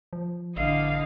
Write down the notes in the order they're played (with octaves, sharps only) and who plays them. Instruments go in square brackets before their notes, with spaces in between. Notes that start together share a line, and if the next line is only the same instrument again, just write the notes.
[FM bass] F3
[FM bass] A1 [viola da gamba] D3 E3 D#5 [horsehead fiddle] F5